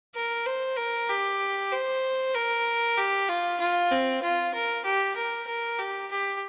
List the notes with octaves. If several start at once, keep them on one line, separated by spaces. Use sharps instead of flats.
A#4
C5
A#4
G4
C5
A#4
G4
F4
F4
C4
F4
A#4
G4
A#4
A#4
G4
G4